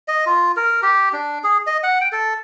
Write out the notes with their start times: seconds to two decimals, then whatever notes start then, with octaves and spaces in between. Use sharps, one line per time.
0.08 D#5
0.26 F4
0.56 A#4
0.82 G4
1.13 D4
1.44 G#4
1.67 D#5
1.83 F#5
2.01 G5
2.12 A4